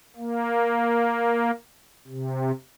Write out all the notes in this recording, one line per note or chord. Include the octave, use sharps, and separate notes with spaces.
A#3
C3